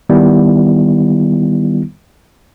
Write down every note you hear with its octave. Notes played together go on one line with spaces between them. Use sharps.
D#3 G3 B3 E4